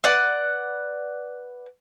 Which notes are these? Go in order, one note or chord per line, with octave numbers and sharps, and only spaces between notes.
B4 D5 F#5